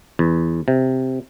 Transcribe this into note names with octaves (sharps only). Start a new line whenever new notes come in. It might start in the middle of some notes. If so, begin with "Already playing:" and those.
E2
C3